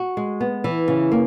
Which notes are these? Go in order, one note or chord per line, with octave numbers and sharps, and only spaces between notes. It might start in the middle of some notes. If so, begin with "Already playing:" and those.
Already playing: F#4
G#3
B3
E3
C#3
A#3